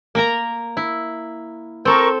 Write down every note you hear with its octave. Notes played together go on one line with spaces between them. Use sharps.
A#3 A#4 A#5
E4
C4 A4 A#4 C#6